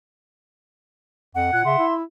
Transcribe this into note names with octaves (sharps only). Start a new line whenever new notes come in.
F2 F#5
A#2 F#6 G#6
C#3 E5 C6
E4